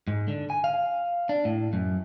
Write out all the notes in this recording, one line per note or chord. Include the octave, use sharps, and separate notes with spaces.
G#2
D3
G#5
F5
D4
A2
F#2